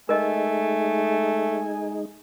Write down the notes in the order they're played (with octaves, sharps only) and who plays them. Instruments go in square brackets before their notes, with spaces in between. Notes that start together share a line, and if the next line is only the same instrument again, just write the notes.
[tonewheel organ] G#3 D#4 [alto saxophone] A3 [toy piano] A#4 D#5 [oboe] G#5